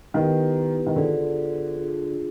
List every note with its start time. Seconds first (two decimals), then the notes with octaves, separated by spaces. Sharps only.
0.14 D#3 B3 E4 G4 B4
0.86 D#3
0.96 D3 F4 G#4 C5
1.77 D4 F4 G#4